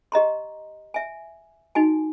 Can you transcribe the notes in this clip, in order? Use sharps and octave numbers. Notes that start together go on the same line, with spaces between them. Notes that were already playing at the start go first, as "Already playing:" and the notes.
G4 D#5 A#5 C6
E5 G#5
D#4 F#4 G#5